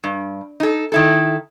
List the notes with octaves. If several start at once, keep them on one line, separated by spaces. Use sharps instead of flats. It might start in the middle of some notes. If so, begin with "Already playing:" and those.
G2
D#4 A4
D#3 E4 A4